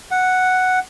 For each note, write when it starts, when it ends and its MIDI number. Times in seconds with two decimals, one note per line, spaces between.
0.11 0.79 78